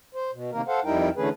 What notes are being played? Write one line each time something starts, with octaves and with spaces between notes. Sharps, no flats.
C5
B2
C3 D#3 A#3 A#4
A4 C5 F5 F#5
F2 G3 D#4 E4 A#4 G5
D3 E3 A3 C#4 G#4 B4